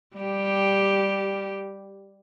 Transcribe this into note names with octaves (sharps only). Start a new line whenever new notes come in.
G3 G4